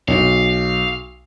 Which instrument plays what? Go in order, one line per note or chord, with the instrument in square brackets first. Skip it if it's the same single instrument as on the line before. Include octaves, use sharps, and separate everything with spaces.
[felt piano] B1 [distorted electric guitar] F5